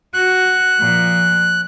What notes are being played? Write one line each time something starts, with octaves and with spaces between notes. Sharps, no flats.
F#4 F#6
A#2 F3